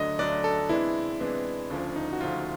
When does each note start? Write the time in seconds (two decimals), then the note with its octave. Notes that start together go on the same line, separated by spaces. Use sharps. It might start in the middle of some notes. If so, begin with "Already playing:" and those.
Already playing: D2 D3 F#3 A3 D4 D#5
0.18 D2 D3 F#3 A3 D4 D5
0.44 A4
0.69 C3 E3 G#3 B3 D4 E4
1.20 C3 E3 G#3 B3 D4
1.70 D2 C#3 F3 D4
1.96 D#4
2.13 F#4
2.21 D2 C#3 F3 F4